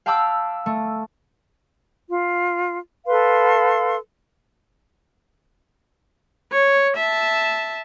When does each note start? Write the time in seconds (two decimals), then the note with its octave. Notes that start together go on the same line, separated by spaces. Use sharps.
0.06 F5 G5 A5 B5 D6 E6
0.66 A3
2.07 F4
3.07 A4 B4 F5 C6
6.52 C#5
6.96 E5 A5